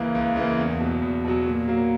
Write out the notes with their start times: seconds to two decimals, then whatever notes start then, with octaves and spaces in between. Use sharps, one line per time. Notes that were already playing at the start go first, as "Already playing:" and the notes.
Already playing: C#2 C#3 E3 A#3
0.15 C#2
0.36 C#3 E3 A#3
0.58 E2
0.80 B2 F#3
1.02 E2
1.25 B2 F#3
1.47 A#2
1.68 F#3 A#3